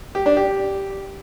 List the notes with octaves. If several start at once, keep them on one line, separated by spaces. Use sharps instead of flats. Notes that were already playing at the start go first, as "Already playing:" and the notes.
G4
D4
G4